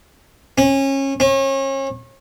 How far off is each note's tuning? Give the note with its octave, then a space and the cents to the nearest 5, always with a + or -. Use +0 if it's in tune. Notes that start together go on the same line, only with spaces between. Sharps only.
C#4 -25
C#4 -35